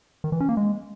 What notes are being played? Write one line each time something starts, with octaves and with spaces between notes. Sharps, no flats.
D#3
E3
C#4
A#3
G#3